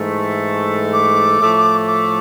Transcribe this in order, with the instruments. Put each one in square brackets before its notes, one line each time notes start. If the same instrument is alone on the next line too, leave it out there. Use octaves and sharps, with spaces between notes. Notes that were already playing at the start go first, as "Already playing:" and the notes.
Already playing: [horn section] G#2 E3 A3
[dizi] D6
[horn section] A2 F3 A3
[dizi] D6